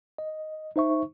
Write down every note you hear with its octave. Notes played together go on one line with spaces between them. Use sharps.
D#5
D#4 C5 E5 C#6